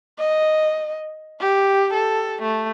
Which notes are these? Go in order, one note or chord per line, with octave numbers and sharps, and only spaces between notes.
D#5
G4
A4
A3